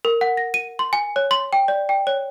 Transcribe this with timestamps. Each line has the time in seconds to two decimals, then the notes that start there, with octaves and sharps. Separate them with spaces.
0.05 A#4
0.21 F#5
0.37 A#6
0.54 D#7
0.79 C6
0.93 G#5
1.16 C#5
1.31 C6
1.53 G5
1.68 D5
1.89 G5
2.07 C#5